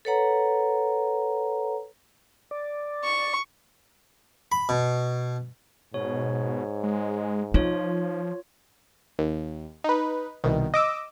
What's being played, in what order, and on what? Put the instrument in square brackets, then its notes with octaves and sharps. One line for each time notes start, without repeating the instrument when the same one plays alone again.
[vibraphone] A4 B4 C#5 F#5 A#5
[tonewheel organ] D5
[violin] C#6
[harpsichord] B5
B2
[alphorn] G#2 [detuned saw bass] B2 [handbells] C#5
[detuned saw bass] G#3
[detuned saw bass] F3 [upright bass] D#4 [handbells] F4 C#5
[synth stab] D#2
D#4 B4
C2 B2 D#3
D#5 D6 E6